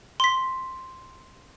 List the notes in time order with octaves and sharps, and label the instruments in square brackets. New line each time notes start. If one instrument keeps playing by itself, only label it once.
[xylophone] C6 B6